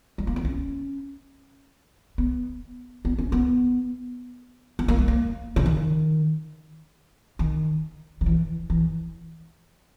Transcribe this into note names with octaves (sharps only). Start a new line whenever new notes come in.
G#3
A#3
B3
C#4
B3
B3
C#4
B3
B3
A#3
G#3
A#3
C#3
D#3
D#3
D#3
E3
E3